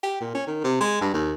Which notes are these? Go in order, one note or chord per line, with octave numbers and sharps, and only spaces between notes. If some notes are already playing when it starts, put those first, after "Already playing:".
G4
A#2
C#4
D#3
C3
G#3
G2
D#2